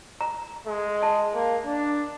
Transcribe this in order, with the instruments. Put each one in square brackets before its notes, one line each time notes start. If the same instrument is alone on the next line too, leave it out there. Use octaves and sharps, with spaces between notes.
[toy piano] A#5
[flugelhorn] G#3
[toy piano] A5
[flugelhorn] A#3
D4